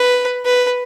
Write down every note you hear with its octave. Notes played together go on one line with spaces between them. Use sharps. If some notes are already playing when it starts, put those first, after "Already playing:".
Already playing: B4
B4